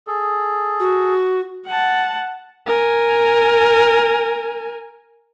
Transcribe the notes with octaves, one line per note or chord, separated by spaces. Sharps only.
G#4 A4
F#4
F#5 A5
A#4 G#5